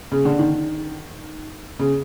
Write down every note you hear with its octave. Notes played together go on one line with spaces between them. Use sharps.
C#3
D3
D#3
C#3